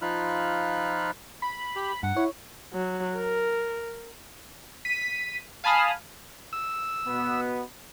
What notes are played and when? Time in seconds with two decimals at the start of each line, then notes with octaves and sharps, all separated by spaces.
0.02 F3 D#4 F4 B5 F6 F#6
1.42 B5
1.75 G4
2.03 G2 F#5
2.16 E4 C#5
2.73 F#3
3.16 A#4
4.85 B6 D#7
5.64 F5 G#5 A5 B5 D#6 F6
6.53 E6
7.07 B2 B3